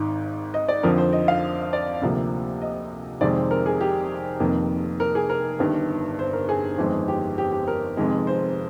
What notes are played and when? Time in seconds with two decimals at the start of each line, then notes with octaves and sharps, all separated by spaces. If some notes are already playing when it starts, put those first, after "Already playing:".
Already playing: G#1 G#2 D#3
0.54 D#5
0.68 D5
0.83 F2 D3 F3 C4 A#4
0.98 C5
1.13 D#5
1.28 F5
1.73 D5
2.02 D2 C3 F3 A#3
2.62 D#5
3.21 F2 C3 D#3 G#3 C4 D5
3.36 C5
3.51 A#4
3.66 G#4
3.81 G4
4.40 F1 F2 D#3 A#3
5.00 A#4
5.15 G#4
5.30 A#4
5.59 G1 G2 D#3
6.19 C5
6.33 A#4
6.49 G#4
6.78 G1 F2 D#3 G#3 C4
7.08 G4
7.38 G4
7.52 G4
7.68 A#4
7.97 F1 F2 D#3 G#3
8.27 C5